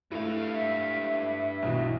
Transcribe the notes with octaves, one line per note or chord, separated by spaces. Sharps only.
G2 A3 E4 F5
E5
B1 B2 E3